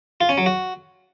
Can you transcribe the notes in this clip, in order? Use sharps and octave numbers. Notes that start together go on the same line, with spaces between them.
F4
C#4
F#3
F#4